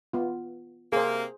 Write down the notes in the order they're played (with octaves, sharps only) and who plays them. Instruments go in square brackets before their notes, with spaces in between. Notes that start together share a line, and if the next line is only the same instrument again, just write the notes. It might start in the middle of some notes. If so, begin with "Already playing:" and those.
[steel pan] B3 F4
[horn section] C3 A#3 [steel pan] G#4 C5